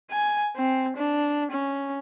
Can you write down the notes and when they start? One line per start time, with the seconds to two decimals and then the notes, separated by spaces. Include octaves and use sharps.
0.11 G#5
0.56 C4
0.97 D4
1.51 C#4